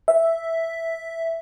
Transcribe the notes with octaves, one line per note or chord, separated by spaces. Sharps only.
E5